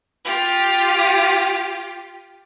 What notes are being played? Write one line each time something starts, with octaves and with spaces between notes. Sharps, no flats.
F4 G4